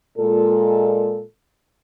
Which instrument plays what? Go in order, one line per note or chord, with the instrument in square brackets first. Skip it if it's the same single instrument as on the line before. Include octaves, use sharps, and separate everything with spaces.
[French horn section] A#2 G#3 A4